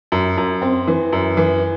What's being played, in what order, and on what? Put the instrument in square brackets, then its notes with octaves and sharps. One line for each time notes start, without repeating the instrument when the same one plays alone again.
[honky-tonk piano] F#2
F#2
C4
E3
F#2
E3